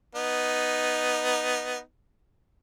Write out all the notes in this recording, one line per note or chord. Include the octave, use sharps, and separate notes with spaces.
B3 D#4